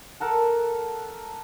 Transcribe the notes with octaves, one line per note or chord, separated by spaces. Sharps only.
A4 A#4 F#5 A5